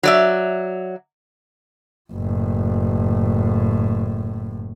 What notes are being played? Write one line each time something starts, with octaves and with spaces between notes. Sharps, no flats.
F#3 D5 E5
F#1 A2